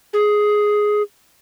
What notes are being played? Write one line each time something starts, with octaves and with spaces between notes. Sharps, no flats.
G#4